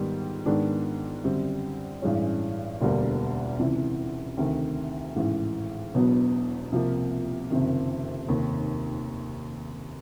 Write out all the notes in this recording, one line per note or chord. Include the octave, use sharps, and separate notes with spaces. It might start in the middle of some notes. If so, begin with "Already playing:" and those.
Already playing: G#2 D#3 G3 B3
G#2 D#3 G#3 B3 D4
F#2 D3 G3 C4
A1 G2 E3 G#3 C#4
E1 D2 D3 G3 A#3
C#2 C3 E3
D2 C3 D#3
A1 G#2 E3
E1 E2 B2 F#3 B3
C2 C3 F3 A#3
F#1 F2 C3 D#3
F1 D#2 D#3